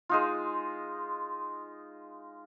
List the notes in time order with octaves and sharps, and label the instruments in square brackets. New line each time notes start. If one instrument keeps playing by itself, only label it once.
[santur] G#3 D#4 F4